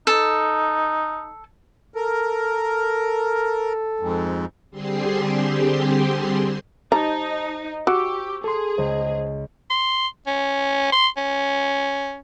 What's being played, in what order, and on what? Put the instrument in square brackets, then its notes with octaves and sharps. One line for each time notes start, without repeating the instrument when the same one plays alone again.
[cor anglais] D#4 [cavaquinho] A4
[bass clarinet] A4 [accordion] A#4
[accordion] F2 G#2
[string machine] D3 G3 C4 G4 G#4 C6
[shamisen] G3 A#5 [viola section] D#4 [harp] C5 [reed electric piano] A5
[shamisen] F#4 [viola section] G4 [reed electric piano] C#6 D6 E6
[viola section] G#4 [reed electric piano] A4 C6
[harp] C#2 D#5 [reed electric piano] C5
[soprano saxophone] C6
C#4
C6
C#4